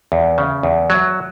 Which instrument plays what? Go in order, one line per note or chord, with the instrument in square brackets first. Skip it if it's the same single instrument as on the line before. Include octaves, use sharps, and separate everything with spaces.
[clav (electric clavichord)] E2
C#3
E2
F#3